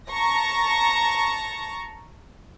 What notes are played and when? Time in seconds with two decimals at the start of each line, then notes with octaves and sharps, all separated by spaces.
0.11 A5 A#5 C#6 A#6